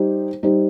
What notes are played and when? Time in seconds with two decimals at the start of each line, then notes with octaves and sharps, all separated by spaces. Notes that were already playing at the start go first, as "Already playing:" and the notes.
Already playing: G3 D#4 G4 C5
0.43 G3 D#4 G4 C5